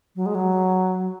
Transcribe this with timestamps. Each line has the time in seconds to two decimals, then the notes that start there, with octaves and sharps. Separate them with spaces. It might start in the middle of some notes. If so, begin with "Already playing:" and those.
0.16 F#3
0.26 G#3
0.35 F#3